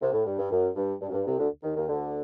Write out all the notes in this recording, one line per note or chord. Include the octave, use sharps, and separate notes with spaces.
C2 C3
A2
G2
G2
F#2
G2
G2
F#2
G2
C2 C3
D2 D3
D#2 D#3
D#2 D#3
D2 D3